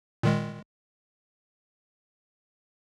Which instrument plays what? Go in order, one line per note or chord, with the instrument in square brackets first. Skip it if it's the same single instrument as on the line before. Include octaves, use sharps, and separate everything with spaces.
[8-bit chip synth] A#2 D#3 G#3